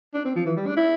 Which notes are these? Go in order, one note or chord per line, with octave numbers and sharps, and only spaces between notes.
D4
C4
F3
E3
G3
D4
E4